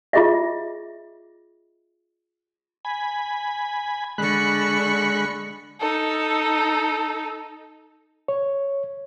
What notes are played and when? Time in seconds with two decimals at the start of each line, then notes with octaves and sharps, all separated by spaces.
0.13 F4 G#4 D#5 E5
2.85 G#5 B5
4.18 D3 G#3 B5 C#6 F#6
5.80 D#4 A4
8.28 C#5